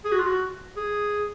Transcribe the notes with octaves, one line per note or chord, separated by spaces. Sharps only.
G#4
F#4
F4
F#4
G#4